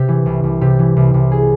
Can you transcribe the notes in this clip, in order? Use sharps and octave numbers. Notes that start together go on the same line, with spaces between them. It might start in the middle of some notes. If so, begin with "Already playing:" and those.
Already playing: C3 G4
E3
C2
C2
C3 G4
E3
C2
C2
G#4